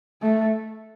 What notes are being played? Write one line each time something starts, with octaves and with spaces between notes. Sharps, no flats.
A3